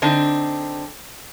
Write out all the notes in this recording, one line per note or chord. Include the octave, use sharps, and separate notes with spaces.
D3 C4 D4 D#4